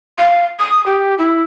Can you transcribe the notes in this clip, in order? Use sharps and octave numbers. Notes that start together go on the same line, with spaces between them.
F5
D#6
G4
E4